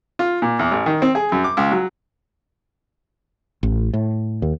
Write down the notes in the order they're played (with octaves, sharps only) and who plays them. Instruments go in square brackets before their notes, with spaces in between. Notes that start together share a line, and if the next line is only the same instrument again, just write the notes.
[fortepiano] F4
A#2
E2
A1
D#3
C4
G#4
F#2
D6
C#2
F#3
[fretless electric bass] A1
A2
D#2